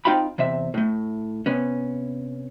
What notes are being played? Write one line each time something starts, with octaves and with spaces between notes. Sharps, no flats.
C4 D#4 F4 F5 G5 B5
E2 C3 C4 E5
A2 A3
C3 B3 C#4